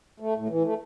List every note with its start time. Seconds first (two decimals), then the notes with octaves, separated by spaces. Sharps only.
0.20 A3
0.34 A2
0.49 E3
0.63 A3